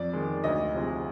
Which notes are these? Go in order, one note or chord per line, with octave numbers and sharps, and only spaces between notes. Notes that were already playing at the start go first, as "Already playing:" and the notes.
Already playing: F2 D5
D#3 G#3
D2 D#5
C3 F3 G#3